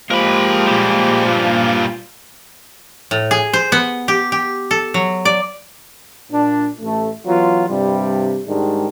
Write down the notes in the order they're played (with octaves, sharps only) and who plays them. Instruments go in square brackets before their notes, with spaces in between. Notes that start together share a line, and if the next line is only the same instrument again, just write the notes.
[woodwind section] F3 A#3 [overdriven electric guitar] G#3 [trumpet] G4 [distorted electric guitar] A#4 B5
[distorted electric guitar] A#2 G3
[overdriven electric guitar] G2 [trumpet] F4
[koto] A2
G#4
C5
B3
G4
G4
A4
F#3
D5
[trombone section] A#2 D4
A1 A3
E3 F#3 B3 F4
G2 C3 G3
G#2 D#3 G3 G#3 D4